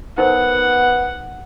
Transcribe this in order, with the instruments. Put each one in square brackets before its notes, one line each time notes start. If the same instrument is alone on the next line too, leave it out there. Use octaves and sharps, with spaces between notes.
[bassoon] B3 [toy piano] D#4 A#4 C5 [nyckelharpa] F#5